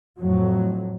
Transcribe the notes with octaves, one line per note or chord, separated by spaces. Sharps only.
F2 A2 F#3